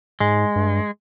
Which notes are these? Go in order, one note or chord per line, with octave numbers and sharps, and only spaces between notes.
G#2 G#3
G2